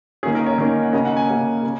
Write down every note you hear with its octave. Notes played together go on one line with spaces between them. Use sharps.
D#3 A#3 C#4 G#4
A#4
C#5
D#3 A#3 C#4
F#5
C#3 A#3 C#4 D#5
F#5
G#5
C#3 A#3 C#4
C#3